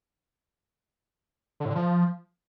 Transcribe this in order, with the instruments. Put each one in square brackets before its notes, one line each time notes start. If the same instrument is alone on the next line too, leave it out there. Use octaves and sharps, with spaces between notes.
[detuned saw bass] D3
A2
D3
F3